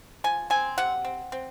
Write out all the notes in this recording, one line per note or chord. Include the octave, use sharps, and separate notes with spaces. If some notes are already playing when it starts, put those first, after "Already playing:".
F3 G#5
C4 G#5
C3 F#5
C4
C4